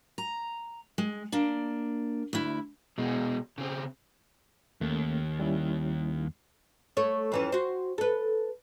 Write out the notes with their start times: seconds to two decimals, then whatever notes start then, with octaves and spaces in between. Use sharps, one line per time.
0.18 A#5
0.98 G#3
1.32 A#3 D4
2.33 D2 E4
2.98 B2 G#3
3.58 C#3 C4
4.81 D#2 A3 A#3 C#4
5.39 G3 C#4 E4
6.97 A3 C#5
7.32 F2 E3 C#4
7.52 F#4 C5
7.98 A4 B4